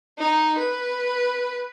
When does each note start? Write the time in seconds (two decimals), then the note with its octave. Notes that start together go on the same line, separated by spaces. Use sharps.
0.19 D#4
0.58 B4